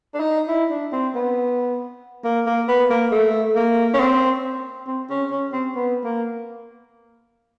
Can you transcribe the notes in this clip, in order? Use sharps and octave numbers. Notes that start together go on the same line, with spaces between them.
D4
D#4
E4
D4
C4
B3
A#3
A#3
B3
A#3
A3
A#3
C#4
C4
C4
C#4
C#4
C4
B3
A#3